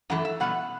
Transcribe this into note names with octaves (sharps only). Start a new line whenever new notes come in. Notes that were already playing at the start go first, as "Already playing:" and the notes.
F#2 E3 A3 F#5
E5
B2 G3 B3 F#5